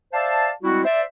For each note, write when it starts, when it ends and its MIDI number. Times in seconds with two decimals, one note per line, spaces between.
0.13 0.50 72
0.13 0.50 74
0.13 0.50 76
0.13 0.50 77
0.13 0.50 81
0.63 0.83 55
0.63 0.83 56
0.63 0.83 60
0.63 0.83 64
0.63 0.83 66
0.85 1.02 72
0.85 1.02 74
0.85 1.02 76